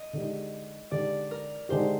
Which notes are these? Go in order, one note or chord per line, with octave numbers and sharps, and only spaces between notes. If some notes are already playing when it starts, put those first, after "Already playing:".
Already playing: D#5
D3 G#3 D#4 G4
D3 G#3 D#4 G4 D5
A#4
D3 G#3 D#4 G4 C5